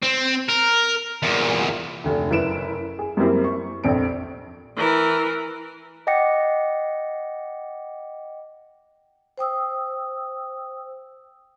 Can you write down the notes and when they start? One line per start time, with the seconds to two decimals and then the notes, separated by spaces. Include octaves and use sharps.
0.03 C4
0.49 A#4
1.23 E2 A#2
2.04 F1 D2
2.31 F#1 E4 B4 D7 E7
2.99 G#4
3.17 F#2 G3 A#3 C4 E4
3.44 C#6
3.84 A#1 F2 C4 D7
4.76 E3 A#4
6.07 D#5 F#5 G5 D6 A#6 C#7
9.38 C5 G5 D#6 E6